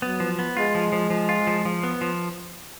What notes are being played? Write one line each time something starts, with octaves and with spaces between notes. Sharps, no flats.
F#3 B3
F3
B3
G#3 F4
F3
F3
F3
F4
F3
F3
B3
F3